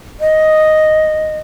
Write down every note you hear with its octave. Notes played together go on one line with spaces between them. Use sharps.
D#5